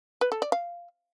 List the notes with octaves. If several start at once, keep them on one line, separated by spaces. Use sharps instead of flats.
B4
A4
D5
F5